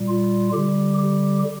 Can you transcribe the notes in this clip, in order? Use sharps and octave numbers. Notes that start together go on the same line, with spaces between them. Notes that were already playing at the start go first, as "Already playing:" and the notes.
Already playing: A#2 G3
F4
D3 G3 G4
G4